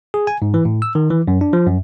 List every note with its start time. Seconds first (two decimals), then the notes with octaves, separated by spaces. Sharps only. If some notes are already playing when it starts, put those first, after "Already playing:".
0.14 G#4
0.27 G#5
0.42 G#2
0.54 E3
0.65 A2
0.82 E6
0.95 D#3
1.10 E3
1.28 F#2
1.41 D4
1.53 F3
1.67 F#2